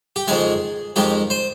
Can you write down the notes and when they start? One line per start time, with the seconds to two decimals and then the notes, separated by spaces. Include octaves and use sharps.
0.16 G4
0.28 F2 D#3 G#3 G#4
0.96 F2 D#3 G#3 G4
1.30 C5